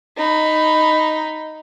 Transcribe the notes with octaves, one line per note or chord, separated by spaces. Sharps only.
D#4 B5